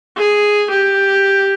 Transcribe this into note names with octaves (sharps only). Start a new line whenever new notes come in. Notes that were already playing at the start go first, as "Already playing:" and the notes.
G#4
G4